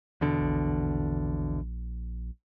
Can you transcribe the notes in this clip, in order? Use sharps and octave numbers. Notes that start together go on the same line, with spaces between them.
E2 B2 D3
A#1